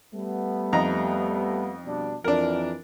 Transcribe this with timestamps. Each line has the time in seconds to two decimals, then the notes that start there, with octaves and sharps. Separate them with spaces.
0.14 G3 A3 B3
0.73 F2 D#4 A#5
1.86 B2 G3 D4
2.24 F2 E3 D4 A#4